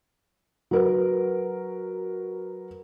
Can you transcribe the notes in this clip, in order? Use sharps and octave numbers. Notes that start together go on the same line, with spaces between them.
F#3 A#4 B4